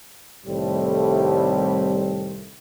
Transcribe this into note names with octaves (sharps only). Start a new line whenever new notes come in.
C2 A2 D#3 G3 A3 C4